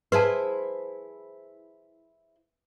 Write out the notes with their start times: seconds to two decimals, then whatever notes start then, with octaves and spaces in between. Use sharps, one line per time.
0.12 E4 G#4 B4 C5 A5